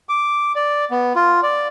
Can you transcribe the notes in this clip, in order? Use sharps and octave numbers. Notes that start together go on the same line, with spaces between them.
D6
D5
B3
F4
D5